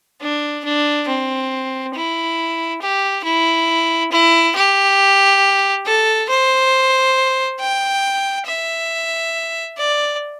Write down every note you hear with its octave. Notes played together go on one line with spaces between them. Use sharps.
D4
D4
C4
E4
G4
E4
E4
G4
A4
C5
G5
E5
D5